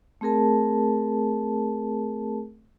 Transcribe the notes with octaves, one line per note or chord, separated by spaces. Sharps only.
A3 C4 G#4 A#4 A5